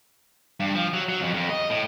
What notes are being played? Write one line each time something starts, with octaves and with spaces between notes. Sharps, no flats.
G2
F3
F#3
F#3
F2
F2
D#5
A2